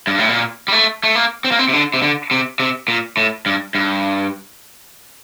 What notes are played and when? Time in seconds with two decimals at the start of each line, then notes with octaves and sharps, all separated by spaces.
0.07 G2
0.18 A2
0.29 A#2
0.68 G3
0.72 A3
1.04 A3
1.15 A#3
1.45 C4
1.52 A#3
1.59 C4
1.69 C3
1.73 D3
1.94 C3
2.02 D3
2.31 C3
2.60 C3
2.88 A#2
3.17 A2
3.46 G2
3.75 G2